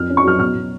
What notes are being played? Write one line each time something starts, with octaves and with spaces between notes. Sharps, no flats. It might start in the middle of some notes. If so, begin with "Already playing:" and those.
Already playing: F2 F6
C#4
C#6
F#3 F6
B2 F6
B2